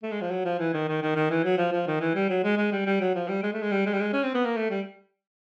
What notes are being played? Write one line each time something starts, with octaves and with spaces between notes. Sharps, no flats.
A3
G#3
F3
F#3
F3
E3
D#3
D#3
D#3
D#3
E3
F#3
F3
F3
D#3
E3
G3
F#3
G#3
G#3
G3
G3
F#3
F3
G3
G#3
A3
G#3
G3
G#3
G3
G#3
C#4
C4
B3
A#3
A3
G3